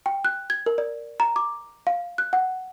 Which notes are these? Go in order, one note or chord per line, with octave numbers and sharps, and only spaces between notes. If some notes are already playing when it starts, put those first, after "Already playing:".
G5
F#6
G#6
A#4
D5
A#5
D6
F5
F#6
F#5